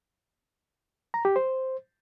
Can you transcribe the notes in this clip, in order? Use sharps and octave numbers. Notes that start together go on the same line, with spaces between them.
A#5
G4
C5